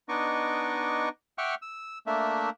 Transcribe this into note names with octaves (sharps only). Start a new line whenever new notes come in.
B3 D4 D#4 D#5 C#6 D6
E5 F#5 G5 C#6 D6 F6
E6
A3 A#3 D4 E5